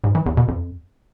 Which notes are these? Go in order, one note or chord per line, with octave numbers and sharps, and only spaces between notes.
G#2
E3
E2
B2
F2